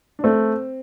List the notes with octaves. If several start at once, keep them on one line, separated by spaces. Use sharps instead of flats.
D4
A3 C4